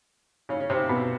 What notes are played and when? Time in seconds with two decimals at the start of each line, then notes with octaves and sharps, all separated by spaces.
0.49 C#3 C#4
0.60 C#4
0.70 C3 C4
0.89 B2 B3